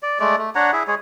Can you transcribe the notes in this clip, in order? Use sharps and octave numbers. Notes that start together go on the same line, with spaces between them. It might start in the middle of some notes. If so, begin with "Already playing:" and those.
D5
G#3 A3 D5
A3
D4 C#5 F#5 A#5
E4 G#4 E5
G#3 G#4 C#5